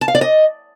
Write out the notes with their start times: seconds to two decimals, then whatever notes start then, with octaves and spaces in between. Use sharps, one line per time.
0.01 A5
0.08 F5
0.15 D5
0.21 D#5